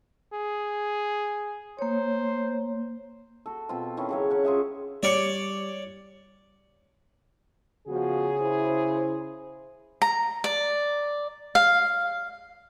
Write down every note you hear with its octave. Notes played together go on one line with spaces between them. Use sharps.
G#4
A#3 C5 C#5
F#4 A4
B2 C4 F4
D#3 E3 C#4
C#3 F#3 C#5
C#4 F#5
F4 G#4 E5
G3 C#5 D5 D6 C#7
C#3 F3 B3 F#4 G#4
E4 C5
A#5
D5
F5